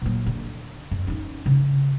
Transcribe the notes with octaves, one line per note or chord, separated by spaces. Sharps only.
A#2 F#3
D3
F#2
C#4 D#4
C#3